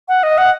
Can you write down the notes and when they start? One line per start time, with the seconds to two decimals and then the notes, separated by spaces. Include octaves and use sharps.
0.08 F#5
0.23 D#5
0.38 F#5